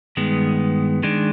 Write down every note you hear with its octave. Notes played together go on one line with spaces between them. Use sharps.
G2 D#3 G#3 B3
D#3 G#3 D4